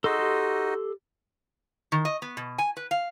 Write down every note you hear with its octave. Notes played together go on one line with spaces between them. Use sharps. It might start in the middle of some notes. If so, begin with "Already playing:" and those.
D#4 F#4 G#4 A4 D#5 C6 E6
G4
D#3
D#5
B3
B2
G#5
B4
F5